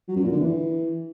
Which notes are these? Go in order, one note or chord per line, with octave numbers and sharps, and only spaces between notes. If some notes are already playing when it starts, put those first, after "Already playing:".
F#3
F#2
A#2
D3
E3